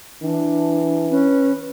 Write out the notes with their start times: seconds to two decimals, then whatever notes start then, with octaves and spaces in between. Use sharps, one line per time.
0.22 E3 D4
1.11 C#4 B4